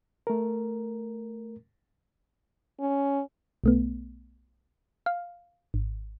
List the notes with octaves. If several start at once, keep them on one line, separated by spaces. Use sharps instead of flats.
A3 A#4
C#4
B1 A3 B3
F5
G#1